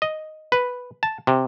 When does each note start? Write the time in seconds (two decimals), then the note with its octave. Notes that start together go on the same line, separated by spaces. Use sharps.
0.02 D#5
0.52 B4
1.03 A5
1.27 C3